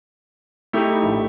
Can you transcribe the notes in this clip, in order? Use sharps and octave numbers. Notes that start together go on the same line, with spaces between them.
A3 D#4 E4 G4
A#1 A2